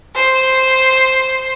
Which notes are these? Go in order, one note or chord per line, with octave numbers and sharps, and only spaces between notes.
C5